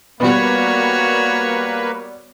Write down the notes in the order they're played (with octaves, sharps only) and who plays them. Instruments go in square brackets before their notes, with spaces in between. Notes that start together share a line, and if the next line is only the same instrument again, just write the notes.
[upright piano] G3 B3 [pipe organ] A#3 B4 [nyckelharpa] F#4 C#5